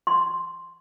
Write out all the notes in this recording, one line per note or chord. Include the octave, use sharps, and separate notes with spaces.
C6